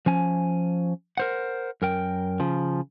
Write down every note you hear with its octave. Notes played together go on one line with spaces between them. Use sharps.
F3 C#4 G#5
A#4 C5 F#5
F#2 A#4 G5
C#3 F3